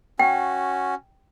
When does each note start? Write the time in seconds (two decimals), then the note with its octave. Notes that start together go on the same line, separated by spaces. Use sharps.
0.19 C#4 F#4 G5